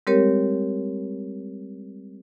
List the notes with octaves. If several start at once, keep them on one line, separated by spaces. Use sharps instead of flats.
G3 G#3 C4 G4 A#4 C#5